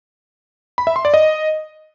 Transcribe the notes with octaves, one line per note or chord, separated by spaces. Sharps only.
B5
E5
C6
D5
D#5